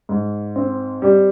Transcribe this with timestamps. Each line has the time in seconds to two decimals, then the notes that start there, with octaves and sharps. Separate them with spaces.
0.09 G#2
0.56 C4
1.02 G3